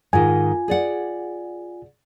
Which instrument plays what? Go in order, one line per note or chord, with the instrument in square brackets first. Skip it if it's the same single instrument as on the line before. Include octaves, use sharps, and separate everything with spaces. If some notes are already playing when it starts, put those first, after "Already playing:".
[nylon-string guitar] G#2 D#3 [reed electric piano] F4 G#5
[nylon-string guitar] G#4 D5 F#5